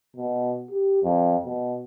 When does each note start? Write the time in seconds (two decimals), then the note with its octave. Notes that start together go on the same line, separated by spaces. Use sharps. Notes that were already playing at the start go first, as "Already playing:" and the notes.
0.16 B2
0.70 G4
1.03 F2
1.45 B2